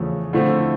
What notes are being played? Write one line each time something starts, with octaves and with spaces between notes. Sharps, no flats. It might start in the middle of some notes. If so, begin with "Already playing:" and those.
Already playing: E2 C#3 F3 A3
D3 F3 A3 C4 E4